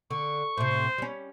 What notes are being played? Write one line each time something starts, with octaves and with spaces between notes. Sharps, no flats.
D3 C#6
A2 C3 C5
G3 C#4